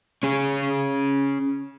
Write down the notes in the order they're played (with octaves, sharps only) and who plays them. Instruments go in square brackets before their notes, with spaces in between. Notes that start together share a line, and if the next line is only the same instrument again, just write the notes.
[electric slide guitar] C#4 G#4